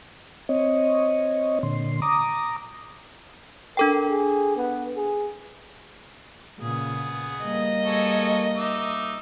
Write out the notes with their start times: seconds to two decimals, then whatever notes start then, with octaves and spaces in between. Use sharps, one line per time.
0.49 C4 C#5 D#5
1.63 A#2 D3 C6
2.02 A#5 D6 D#6
3.77 D4 A4 A#4 G5
4.09 G#4
4.56 B3
4.96 G#4
6.59 A#2 C#3 B3 G#4
7.44 G3 A#3 D#5
7.85 G#3 A4 C#5
8.56 D#4 E5 D6